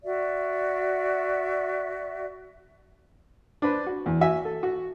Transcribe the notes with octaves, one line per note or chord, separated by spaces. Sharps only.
F#4 D5 E5
D4 B4 C5
F#4
E2
F#4 E5 G#5
A4
F#4